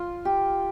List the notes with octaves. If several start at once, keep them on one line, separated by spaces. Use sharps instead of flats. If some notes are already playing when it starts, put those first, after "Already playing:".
Already playing: F4
G4